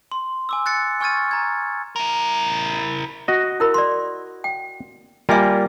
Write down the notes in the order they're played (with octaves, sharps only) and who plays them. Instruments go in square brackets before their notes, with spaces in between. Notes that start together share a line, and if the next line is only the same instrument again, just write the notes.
[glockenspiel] C6
G#5 D6 E6
F#6 A6 C#7
G#5 C#6 F6 G#6 A6 D#7
A#5 G#6
[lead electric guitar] E4 A#4
[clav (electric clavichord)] F#4 D#5
[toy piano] E4 A#4 B5
D5 C6
G5
[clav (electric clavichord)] G3 A#3 F4 [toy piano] E5 G#5 B5